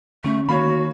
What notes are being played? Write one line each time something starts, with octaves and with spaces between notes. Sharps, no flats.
D3 A3 C#4 C#6
D#3 A#3 F#4 C#5 F5 B5